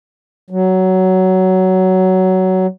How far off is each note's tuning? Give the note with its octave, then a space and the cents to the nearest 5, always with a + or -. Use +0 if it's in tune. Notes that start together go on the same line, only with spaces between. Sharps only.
F#3 +15